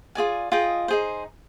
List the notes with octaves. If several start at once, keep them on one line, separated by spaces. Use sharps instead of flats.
F4 G#4 D5 G#5
F4 G#4 D#5 G5
D#4 G#4 C5